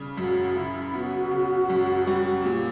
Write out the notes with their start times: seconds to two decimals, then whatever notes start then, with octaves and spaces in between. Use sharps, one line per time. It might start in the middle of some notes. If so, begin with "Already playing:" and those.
Already playing: C#3 G3
0.17 F#2 F#4
0.56 C#3 E4
0.93 B3 F#4
1.31 C#3
1.70 F#2
2.07 G3
2.45 A#2 G4